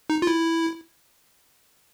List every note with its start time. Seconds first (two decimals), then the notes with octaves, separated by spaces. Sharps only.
0.10 D#4
0.22 F4
0.27 E4